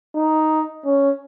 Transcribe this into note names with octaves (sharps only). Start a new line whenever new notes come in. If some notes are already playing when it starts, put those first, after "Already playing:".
D#4
C#4